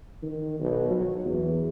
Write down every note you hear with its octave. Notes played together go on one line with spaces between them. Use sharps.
D#3
B1
F#3
E2